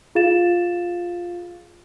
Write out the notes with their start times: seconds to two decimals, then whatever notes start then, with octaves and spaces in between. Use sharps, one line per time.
0.15 F4 G#4 F5 A6 E7